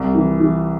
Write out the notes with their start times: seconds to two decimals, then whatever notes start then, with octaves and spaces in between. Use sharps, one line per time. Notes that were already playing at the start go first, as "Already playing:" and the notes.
Already playing: C2
0.15 E3
0.40 E3